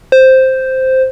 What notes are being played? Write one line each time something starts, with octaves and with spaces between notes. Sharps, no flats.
C5